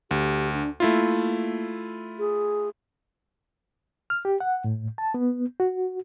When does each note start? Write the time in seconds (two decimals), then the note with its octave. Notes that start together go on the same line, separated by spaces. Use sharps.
0.11 D2 G4
0.53 D4
0.80 A3 A#3 E4 F4
2.19 G#4
4.10 F6
4.25 G4
4.40 F#5
4.64 A2
4.98 A5
5.14 B3
5.60 F#4